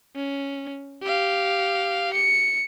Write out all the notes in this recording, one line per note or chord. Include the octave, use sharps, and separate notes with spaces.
C#4
G4 F5
C#7